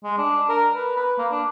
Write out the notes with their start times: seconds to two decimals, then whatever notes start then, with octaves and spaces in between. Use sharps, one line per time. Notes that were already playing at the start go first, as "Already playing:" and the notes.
0.04 G#3
0.18 D4
0.49 A#4
0.75 B4
0.96 B4
1.18 A#3
1.31 D4